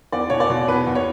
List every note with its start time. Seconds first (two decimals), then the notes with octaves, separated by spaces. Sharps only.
0.12 E2 D5
0.30 B2 C#5
0.40 D5
0.50 B2
0.68 E2 B4
0.87 E2
0.95 C#5